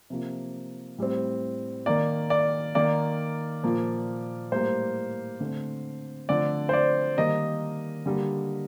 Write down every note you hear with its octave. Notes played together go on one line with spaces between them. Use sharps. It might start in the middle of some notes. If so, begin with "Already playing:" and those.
C3 F3 A#3
A2 G3 C4
D#3 A#3 D5
D5
D#3 A#3 D5
A#2 F3 A#3
A2 G3 A#3 C5
D3 A3 C4
D3 F3 A3 C4 D5
C5
D5
D#3 G3 A#3 D#5
D3 G3 A#3